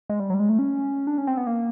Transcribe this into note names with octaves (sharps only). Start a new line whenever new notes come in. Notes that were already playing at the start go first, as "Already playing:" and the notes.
G#3
G3
F#3
G3
G#3
A3
C#4
D4
C#4
C4
B3
A#3